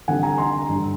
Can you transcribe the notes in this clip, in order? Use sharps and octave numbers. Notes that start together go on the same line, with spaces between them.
D3 G3 C4 D#4 F#5 G#5
G#5 A#5
A#5 C6
G2 D3 G3